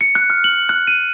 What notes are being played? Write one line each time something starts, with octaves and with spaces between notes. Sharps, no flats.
C#7
F#6
F6
F#7
F#6
D#7